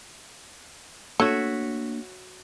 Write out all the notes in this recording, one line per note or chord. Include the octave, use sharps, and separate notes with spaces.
A3 A#3 D4 F#4 C#5 E5